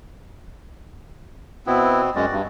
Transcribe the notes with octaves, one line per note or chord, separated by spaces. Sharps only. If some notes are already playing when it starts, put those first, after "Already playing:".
B2 B3 C4 E4
F#2 G#3 C#4 F#4 D5
G2